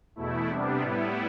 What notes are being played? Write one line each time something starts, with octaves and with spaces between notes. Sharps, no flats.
E2 B2 A3 E4
C3 G3 B3 D4
A2 G3 B3 E4